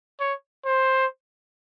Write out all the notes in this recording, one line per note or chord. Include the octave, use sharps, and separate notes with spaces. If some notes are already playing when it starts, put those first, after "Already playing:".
C#5
C5